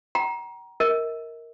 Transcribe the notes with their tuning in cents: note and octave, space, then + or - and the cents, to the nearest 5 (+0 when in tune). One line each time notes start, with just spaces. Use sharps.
G5 -45 A#5 +25
A#4 +0 D#5 +45